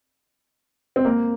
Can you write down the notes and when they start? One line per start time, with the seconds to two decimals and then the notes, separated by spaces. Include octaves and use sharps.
0.96 C4
1.05 A#3